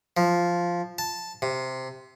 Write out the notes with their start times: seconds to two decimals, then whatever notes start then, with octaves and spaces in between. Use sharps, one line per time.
0.17 F3
0.98 A5
1.42 C3